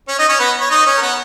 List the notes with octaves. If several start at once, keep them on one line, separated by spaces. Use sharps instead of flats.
C#4 C#5
D#4 D#5
C#4 C#5
B3 B4
C#5
D#4 D#5
C#4 C#5
A#4
B3 B4